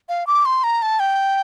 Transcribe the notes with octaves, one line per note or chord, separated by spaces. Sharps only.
F5
D6
C6
A#5
A5
G5